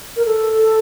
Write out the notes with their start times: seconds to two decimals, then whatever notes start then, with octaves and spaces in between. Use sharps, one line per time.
0.16 A#4
0.26 A4